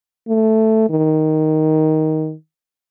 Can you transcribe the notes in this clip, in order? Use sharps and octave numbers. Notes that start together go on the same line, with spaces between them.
A3
D#3